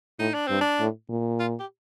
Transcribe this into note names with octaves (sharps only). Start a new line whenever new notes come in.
A2 D#4
D4
G2 C4
D4
A2
A#2
F4
G4